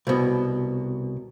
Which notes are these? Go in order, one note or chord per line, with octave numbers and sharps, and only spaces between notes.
C2 B2